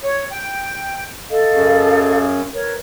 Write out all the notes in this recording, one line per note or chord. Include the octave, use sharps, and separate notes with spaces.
C#5
G5
A4 D#5 F5
F#2 C#3
A#4 B4 C#5